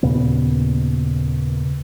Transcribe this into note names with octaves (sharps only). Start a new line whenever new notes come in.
D#2 A#2 C#3 B3